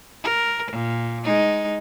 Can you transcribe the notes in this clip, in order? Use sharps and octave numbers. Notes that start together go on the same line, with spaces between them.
A#4
A#2
G#3 D#4